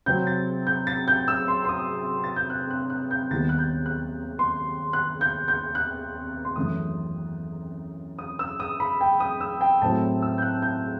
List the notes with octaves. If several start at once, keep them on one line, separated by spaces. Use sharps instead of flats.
C3 F#3 C4 G6
A6
G6
A6
G6
E6
C6
C6
D#6
A6
G6
F#6
F#6
F#6
G6
D#2 D#3 G3 B3 D#4 A6
F#6
G6
F#6
C6
F#6
G6
G6
F#6
C6
F#2 E3 A3 D#6
D#6
E6
D#6
B5
G5
D#6
E6
G5
A2 F#3 A3 C4 E4 A5
E6
G6
F#6
G6